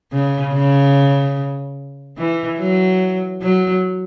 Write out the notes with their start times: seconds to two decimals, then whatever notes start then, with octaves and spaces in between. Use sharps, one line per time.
0.12 C#3
0.54 C#3
2.18 E3
2.58 F#3
3.42 F#3